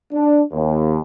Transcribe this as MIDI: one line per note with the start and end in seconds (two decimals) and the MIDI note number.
0.13 0.42 62
0.53 0.99 39